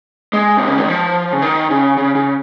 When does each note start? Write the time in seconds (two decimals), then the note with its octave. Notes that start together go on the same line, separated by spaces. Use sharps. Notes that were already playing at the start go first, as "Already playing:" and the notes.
0.33 G#3
0.57 C3
0.67 C#3
0.78 D#3
0.89 F3
1.33 C#3
1.42 D#3
1.70 C#3
1.97 C#3
2.15 C#3